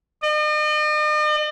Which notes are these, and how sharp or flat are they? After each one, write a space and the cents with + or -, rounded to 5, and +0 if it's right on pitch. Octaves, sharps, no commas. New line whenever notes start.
D#5 -45